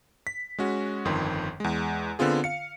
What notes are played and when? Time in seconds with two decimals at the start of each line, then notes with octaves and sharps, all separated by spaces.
0.27 B6
0.58 G#3 C#4 F#4
1.05 G1 F2 D#3 C6
1.60 E2 G#3
2.19 D3 B3 C4 F4 G#4
2.44 F5 C#7